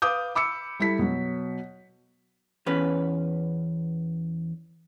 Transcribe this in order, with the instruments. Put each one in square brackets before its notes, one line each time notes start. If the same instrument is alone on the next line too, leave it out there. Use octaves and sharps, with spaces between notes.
[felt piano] B4 F5 D6 D#6 G6
B5 D6 E6 C#7
G3 E4 A4 B6
B2 F#3
[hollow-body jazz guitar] E2 C#4 B4